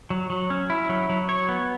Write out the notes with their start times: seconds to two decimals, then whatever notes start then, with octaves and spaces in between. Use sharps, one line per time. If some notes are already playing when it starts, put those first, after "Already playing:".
0.10 F#3
0.30 F#3
0.50 C#4
0.70 E4
0.89 F#3
1.10 F#3
1.29 C#5
1.49 B3